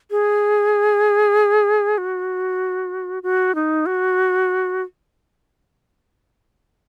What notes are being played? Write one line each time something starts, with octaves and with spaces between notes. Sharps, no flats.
G#4
F#4
F#4
D#4
F#4